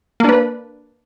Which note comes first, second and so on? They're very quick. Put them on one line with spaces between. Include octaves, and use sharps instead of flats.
A#3 D4 B4